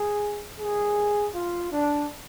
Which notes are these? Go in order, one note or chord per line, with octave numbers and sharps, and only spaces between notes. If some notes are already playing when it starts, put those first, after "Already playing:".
Already playing: G#4
D#2 D#3 G3 G#4
F4
D4